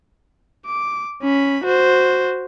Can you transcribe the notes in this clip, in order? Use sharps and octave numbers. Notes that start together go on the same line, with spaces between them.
D6
C#4 B5
F#4 C5